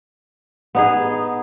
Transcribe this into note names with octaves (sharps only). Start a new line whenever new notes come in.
B3 D#4 G#4